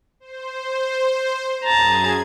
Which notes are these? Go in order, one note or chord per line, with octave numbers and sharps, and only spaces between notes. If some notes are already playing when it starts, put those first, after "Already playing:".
C5
F#2 G#4 A5 A#5 G#6